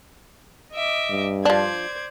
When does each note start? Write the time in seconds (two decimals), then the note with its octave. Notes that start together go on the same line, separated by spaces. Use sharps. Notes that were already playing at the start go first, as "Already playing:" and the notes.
0.73 D#5 E5 D6
1.11 G2
1.45 F3 D4 C5 D5 G#6